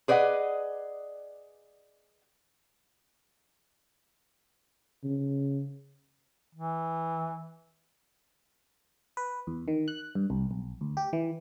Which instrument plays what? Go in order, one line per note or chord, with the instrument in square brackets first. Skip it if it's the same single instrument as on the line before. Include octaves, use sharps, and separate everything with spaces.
[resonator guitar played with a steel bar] G#4 B4 D5 D#5 F#5
[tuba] C#3
[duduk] E3
[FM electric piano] B4
E2
D#3
F#6
G2
C2
B1
D2
G4
E3